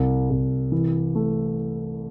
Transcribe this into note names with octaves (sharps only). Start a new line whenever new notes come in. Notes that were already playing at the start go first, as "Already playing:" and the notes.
Already playing: C2
C2
E3
A3